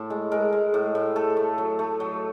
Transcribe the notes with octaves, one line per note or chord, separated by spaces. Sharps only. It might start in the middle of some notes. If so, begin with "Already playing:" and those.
Already playing: A2 A4
G#3
G#3 A#4
G#3
A2
A2
A3 A4
A3
F#3
A3
F#3